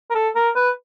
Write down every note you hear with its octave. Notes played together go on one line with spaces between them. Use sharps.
A#4
A4
A#4
B4